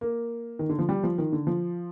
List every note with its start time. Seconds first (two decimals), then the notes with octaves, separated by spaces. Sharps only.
0.01 A#3
0.59 D#3
0.70 D3
0.79 F3
0.89 G3
1.03 F3
1.18 D#3
1.32 D3
1.47 F3